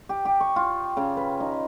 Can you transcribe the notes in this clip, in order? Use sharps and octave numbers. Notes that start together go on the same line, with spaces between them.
G4
G4
C#6
F4
C#3
B4
D#4